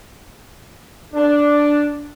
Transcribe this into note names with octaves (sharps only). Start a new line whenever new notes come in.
D4